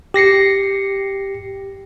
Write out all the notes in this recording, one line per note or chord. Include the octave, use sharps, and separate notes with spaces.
G4 A#6 C7 C#7